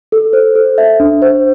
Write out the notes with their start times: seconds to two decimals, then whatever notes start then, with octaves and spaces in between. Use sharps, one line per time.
0.12 A4
0.33 C5
0.55 A4
0.78 E5
1.00 D4
1.22 C5